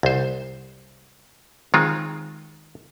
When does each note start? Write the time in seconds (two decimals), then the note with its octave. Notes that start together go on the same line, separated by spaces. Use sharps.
0.03 C2 C5
1.74 D#3 G#3 C4 F4